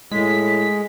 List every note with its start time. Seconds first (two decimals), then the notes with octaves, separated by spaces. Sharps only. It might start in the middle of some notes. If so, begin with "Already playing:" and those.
0.11 A2 G#3 B6